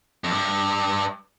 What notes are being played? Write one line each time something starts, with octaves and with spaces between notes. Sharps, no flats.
F2
G2